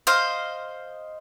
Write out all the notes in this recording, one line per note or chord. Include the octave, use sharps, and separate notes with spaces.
C5 D#5 F5